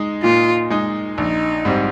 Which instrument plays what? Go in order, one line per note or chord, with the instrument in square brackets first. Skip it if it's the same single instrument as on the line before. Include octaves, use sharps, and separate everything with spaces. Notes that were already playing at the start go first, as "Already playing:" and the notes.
Already playing: [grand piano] G#3 D#4
[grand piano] A#2 [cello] F4
[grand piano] G#3 D#4
[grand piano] A#1 [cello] D#4
[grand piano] G#2 G3 C4